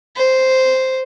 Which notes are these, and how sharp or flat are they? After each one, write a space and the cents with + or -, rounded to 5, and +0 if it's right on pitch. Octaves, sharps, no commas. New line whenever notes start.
C5 -5